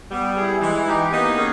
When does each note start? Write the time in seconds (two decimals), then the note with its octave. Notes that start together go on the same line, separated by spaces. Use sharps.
0.11 G3 B3
0.36 E4 G#4
0.61 E3 G#3
0.87 D#4 G4
1.12 A#3 B3 D#4
1.37 C#4 G#4